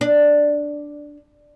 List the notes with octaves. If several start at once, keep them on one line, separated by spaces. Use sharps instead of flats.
D4